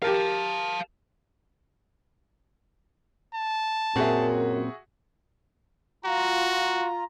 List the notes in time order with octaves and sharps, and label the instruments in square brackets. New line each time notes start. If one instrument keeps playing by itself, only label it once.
[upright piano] G4 A#4 [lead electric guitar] F5 A5
[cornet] A5
[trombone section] F#2 [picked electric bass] A#2 C4 [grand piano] F#4 G#4 E5
[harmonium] F4 A#5 [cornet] F#4